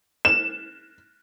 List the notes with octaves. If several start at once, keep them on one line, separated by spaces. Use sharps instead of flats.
E7